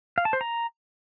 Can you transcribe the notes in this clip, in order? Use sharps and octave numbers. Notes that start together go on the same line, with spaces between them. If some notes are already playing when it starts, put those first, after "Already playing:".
F5
A5
C5
A#5